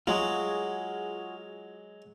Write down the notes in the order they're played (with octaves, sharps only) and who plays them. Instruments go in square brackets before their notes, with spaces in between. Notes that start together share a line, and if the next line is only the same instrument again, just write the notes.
[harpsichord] F#3 G#3 [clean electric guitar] F4 F#4 G#4